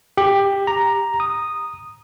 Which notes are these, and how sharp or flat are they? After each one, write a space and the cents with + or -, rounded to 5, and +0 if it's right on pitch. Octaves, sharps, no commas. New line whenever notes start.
G4 +10
A#5 +5
D#6 -10